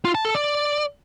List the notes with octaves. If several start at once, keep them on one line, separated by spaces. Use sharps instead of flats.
F4
A5
A4
D5